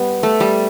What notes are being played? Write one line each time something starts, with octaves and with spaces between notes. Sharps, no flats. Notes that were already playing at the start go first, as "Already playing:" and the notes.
Already playing: G3 B3
A3
G3